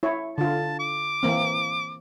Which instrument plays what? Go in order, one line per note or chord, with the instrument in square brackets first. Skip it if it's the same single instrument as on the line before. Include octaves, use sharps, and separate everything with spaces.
[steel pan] E4 C#5
[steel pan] D3 F4 [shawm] A5
[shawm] D6
[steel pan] E3 A#3 C4